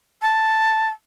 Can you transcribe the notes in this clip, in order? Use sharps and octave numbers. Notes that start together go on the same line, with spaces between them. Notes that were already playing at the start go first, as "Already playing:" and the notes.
A5